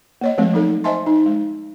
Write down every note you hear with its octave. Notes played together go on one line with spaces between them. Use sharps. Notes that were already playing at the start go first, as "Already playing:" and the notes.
A#3 C#5 D#5
F3 G#3 A3 C4
F#3 D#4 A4
C5 D#5 E5 G#5 A5 C6
D#4
G#3